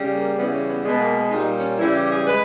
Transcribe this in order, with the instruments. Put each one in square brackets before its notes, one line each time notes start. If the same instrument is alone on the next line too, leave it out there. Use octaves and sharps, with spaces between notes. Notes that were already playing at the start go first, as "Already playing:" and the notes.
Already playing: [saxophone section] C#3 G3
A#3
C#3 E3 G3 B3
C#4
B3
B2 G#3 B3
A#3
B3
A#2 G3 D#4
C#4
C#3 E3 G3 E4
G4
G#4
G#3 B4